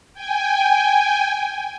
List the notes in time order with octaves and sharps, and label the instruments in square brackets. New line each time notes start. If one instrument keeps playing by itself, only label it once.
[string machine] G5 G#5